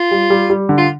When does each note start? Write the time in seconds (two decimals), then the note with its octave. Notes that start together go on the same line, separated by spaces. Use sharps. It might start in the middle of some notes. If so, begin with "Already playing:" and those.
Already playing: F4
0.11 G3
0.30 G3
0.50 G3
0.69 D3
0.78 F4